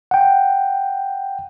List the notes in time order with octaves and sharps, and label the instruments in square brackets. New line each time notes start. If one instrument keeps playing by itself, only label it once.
[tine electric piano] F#5 G5